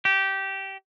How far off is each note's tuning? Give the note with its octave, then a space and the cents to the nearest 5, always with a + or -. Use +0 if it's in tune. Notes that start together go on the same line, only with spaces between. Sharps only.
G4 -15